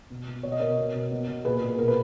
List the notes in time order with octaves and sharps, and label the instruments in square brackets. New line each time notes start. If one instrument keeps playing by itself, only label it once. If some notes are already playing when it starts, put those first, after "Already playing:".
[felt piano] B2
B2
B2 C#5
D#5
B2 A#4 C#5
B2
B2
B2
B2
A#2 G#4 B4
A#2
B2 A#4
B4